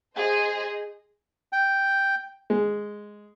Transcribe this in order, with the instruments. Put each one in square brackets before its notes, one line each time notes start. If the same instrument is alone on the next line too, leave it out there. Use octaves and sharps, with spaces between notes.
[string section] G#4 C5 D#5
[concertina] G5
[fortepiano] G#3